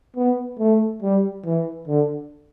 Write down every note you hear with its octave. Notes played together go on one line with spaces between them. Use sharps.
B3
A3
G3
E3
D3